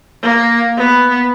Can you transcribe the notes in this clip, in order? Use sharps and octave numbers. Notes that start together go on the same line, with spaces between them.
A#3
B3